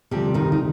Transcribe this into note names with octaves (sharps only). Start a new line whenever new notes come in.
D2 C3 F3 G3 G4
D#3 D#4
D#4